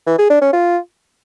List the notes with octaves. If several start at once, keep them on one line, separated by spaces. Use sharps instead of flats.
E3
G#4
D4
C#4
F4